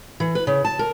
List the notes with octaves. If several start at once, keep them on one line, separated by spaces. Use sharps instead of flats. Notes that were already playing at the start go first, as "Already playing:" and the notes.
E3
B4
C#3
A5
A#4